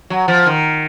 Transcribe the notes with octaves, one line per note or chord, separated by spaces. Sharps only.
F#3
F3
D#3